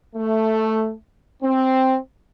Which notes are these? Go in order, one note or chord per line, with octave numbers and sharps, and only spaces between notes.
A3
C4